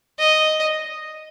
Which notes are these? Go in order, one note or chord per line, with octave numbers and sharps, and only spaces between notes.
D#5